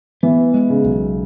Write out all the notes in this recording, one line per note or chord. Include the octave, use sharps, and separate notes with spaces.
E3 B3
G#3
C#3
B1